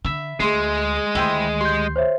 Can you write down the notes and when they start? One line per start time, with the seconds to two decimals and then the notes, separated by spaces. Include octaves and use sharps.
0.05 D3 E5 B5
0.40 D2 G#3 G#4 C6 C7
1.15 D2 D#3 E4 G4 C5
1.61 G4 C6 G6
1.96 C5 C#5 E5